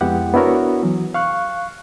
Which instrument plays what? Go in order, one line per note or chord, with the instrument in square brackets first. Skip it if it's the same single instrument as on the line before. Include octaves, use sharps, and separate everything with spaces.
[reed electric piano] F2 G#3 B3 E4 G4 F#5
B3 D4 E4 F#4 A#4 C#5
E3 F#3
F5 C#6 F#6